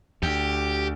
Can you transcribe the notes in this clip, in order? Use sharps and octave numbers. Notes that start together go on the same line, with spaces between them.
D2 G4